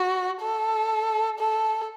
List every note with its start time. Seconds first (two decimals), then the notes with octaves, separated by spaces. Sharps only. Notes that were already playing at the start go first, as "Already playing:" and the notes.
Already playing: F#4
0.41 A4
1.39 A4